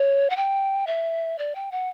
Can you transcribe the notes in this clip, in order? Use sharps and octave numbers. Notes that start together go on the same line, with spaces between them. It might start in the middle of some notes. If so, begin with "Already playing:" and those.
Already playing: C#5
F#5
G5
E5
D5
G5
F#5